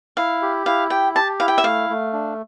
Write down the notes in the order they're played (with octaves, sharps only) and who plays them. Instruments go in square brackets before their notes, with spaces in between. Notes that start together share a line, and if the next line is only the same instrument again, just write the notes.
[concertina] E4 [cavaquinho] F5
[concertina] G4
[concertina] E4 [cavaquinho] F5
[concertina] G4 [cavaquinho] G5
[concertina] G4 [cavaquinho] A5
[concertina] E4 [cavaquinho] F5
[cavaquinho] G5
E5
[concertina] A3 [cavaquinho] F5
[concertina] A3
D4